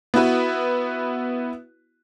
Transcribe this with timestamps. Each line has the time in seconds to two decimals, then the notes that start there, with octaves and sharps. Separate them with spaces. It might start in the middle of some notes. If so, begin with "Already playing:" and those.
0.14 B3 E4 F#4 B4